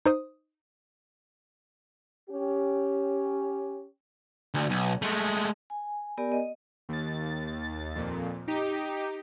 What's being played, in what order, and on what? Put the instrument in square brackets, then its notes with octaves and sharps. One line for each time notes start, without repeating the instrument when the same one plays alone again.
[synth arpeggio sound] D#4 C5 D#6
[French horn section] C#4 G4
[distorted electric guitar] D2
B1
G#3 A3
[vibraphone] G#5
B3 G4 A#4 D5 G#5
D#5
[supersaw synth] D#2 A6
F2 A#2
D#4 G4